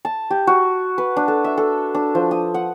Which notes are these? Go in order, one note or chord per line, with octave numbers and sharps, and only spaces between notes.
A5
G4
F#4
B4
D4
A4
E5
A4
D4
F3
D#6
F#5